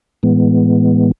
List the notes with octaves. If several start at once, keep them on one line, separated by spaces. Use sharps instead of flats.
A2 E3 G#3 B3